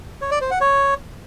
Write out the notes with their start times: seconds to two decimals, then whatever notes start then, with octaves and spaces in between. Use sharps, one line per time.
0.21 C#5
0.31 D5
0.41 C5
0.51 F#5
0.61 C#5